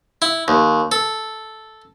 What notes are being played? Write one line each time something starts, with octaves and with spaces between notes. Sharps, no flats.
E4
D#2
A4